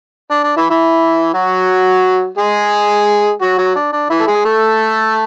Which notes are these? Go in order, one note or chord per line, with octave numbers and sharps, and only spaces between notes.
D4
D4
E3 E4
E3 E4
F#3 F#4
G#3 G#4
F#3 F#4
F#3 F#4
D4
D4
E3 E4
A4
G#3 G#4
A3 A4